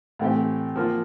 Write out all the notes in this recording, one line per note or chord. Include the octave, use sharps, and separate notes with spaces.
A2 E3 A3 C4 G4
F3 A#3 F4